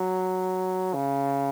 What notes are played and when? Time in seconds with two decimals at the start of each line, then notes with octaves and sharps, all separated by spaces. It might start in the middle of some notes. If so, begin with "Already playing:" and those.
Already playing: F#3
0.94 C#3